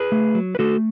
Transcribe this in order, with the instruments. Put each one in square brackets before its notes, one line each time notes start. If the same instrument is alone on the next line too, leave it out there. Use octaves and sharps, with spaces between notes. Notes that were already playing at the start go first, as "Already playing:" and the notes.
Already playing: [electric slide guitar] G#4 B4
A3
F#3
B4
A3 F#4 A4